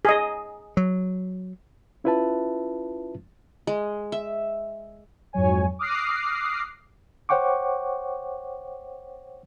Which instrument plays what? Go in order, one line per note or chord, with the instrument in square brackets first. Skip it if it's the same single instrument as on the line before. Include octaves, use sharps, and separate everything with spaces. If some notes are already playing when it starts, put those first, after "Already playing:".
[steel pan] G#4 D#5
[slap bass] F#3
[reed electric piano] C#4 E4 F4 B4 E5 A5
[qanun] G#3
E5
[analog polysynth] F2 G#2 F#3 C#5 G#5
D6 D#6 F6 F#6 A#6 C7
[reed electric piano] C5 C#5 F#5 G5 C#6 D6